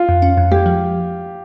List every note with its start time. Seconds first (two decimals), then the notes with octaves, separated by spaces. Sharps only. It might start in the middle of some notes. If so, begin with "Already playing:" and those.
Already playing: F4
0.09 F2
0.22 C#4
0.37 F2
0.52 G#3 G4
0.66 F3